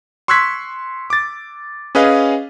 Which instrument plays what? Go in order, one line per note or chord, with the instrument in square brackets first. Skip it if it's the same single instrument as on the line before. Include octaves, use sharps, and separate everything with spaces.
[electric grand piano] C6 C#6 E6 F#6 G#6 B6
D6 A6
C#4 G#4 B4 D#5 F5